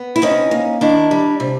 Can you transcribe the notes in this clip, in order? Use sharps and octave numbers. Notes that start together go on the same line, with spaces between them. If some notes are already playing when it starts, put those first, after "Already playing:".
Already playing: B3
E4
C3 C#4 D#4
A#3
D#3 D4 E4
G3
C3